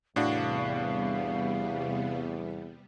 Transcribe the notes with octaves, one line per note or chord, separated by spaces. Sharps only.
E2 A2 C3 G3 B3 D4 F#4 F5